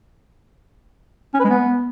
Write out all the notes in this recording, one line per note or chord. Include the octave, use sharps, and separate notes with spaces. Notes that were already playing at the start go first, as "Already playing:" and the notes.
C#4
B4
G#3
B3